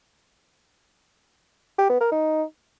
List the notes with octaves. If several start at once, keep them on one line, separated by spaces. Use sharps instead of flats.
G4
B3
A#4
D#4